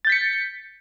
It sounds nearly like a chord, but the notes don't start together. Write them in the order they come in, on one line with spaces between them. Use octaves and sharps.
A6 G6 B6 C#7